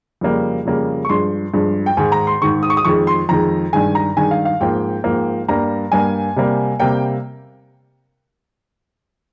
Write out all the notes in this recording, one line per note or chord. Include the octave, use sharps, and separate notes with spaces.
F2 C#3 G3 A#3
F2 C#3 G3 A#3
C#6
G2 F3 G#3 C6
G2 F3 G#3
G5
G#2 D#3 G#3 G#5
A#5
C6
G#2 D#3 G#3 C#6
D#6
C#6
D#6
F2 D#3 G#3 C#6
C6
F2 D#3 G#3 A#5
G2 D#3 G#3 G#5
A#5
G2 D#3 G#3 G#5
F5
F5
G#2 F3 A#3 G5
G#2 F3 A#3
G2 G3 A#3 A#5
G2 G3 A#3 G#5
C3 G3 A#3
C3 G3 A#3 G5